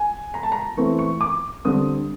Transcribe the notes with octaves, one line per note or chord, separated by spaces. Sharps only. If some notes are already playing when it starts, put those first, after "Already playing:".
Already playing: G#5
A#5
A5
A#5
E3 A3 C4 C#6
C#6
D6
D3 G3 C4 D#6